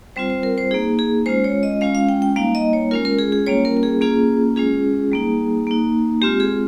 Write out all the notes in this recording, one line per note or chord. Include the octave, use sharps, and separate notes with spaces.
G3 C4 F4 C5
C5
A#4
C5
A#3 D#4 G#4
G#4
G#3 C#4 F4 C5
C#5
D#5
G#3 C#4 F4 F5
F5
G5
G5
G3 A#3 D#4 F5
D#5
C#5
G#3 C#4 F4 A#4
A#4
G#4
G#4
G3 A#3 C#4 F4 C#5
A#4
A#4
G#4
A#3 C#4 F4 G#4
G#3 C#4 F4 G#4
G3 A#3 D#4
A#3 D#4
G#3 C4 F4 G4
G#4